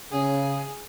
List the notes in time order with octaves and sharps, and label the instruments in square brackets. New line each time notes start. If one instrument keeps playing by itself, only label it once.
[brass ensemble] C#3 [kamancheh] G#4